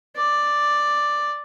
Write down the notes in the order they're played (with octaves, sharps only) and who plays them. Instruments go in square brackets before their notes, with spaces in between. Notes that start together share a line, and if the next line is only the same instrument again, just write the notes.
[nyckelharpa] D5